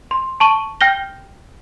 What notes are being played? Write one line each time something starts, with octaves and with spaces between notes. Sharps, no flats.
C6
A5 C#6 D#7 G7
G5 F6 G6 A#6 G7